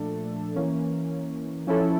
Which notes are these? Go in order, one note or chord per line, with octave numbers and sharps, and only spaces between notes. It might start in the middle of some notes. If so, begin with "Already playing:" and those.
Already playing: A#2 F3 A3 D4 A4
E3 A#3 C#4
F3 C#4 E4 A4